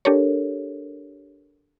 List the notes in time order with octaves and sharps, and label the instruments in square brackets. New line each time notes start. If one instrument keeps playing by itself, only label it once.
[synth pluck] D4 G4 A4 A#4 C#5